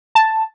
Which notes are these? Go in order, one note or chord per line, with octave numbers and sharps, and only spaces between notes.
A5